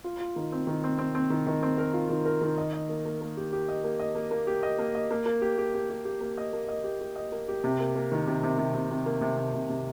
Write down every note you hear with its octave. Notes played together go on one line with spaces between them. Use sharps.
F4
F4
D#3
C4
D#3
C4
C4
C4
D#3
D#3
C4
A#4
F4
D#3
A#4
D#3
D#5
D#5
A#3
A#3
A#3
G4
G4
D#5
A#3
D#5
A#3
A#3
G4
D#5
A#3
D#5
A#3
A#3
G4
G4
G4
G4
G4
A#3
D#5
A#3
D#5
G4
G4
D#5
A#3
G4
C3
A#3
A#3
D#3
C3
C3
C3
C3
C3
A#3
C3
C3
C3
C3